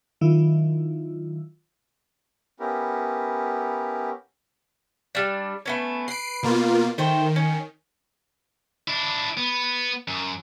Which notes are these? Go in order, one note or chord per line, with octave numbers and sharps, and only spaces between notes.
D#3 F#3 E4 F4
B3 C#4 E4 G4 A#4
G3 D4
A3 B3 C#4
B4 C7 D7
B2 A#3 F4
D#3 A3 C5 G5
C#4
D4 E4
B3
F#2